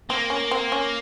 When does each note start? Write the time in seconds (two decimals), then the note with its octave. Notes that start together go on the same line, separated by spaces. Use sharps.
0.09 A#3 C4
0.30 C#4
0.51 C4
0.72 C#4